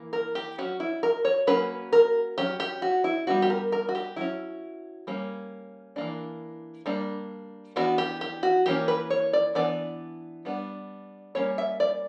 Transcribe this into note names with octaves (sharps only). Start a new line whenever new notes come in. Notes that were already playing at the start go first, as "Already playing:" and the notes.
Already playing: E3 A#3
A#4
G4
F#3 C#4 F#4
E4
A#4
C#5
F#3 A#3 C#4 B4
A#4
F#3 C#4 G4
G4
F#4
E4
G3 B3 D4 F#4
G4
A#4
A#4
F#4
G4
F#3 C#4 E4
G3 A#3 C#4
E3 A#3 D4
G3 A#3 D4
E3 B3 D4 F#4
G4
G4
F#4
E3 A#3 C#4 G4
B4
C#5
D5
E3 B3 D4 D5
G3 B3 D4
G3 A#3 C#4 C#5
E5
D5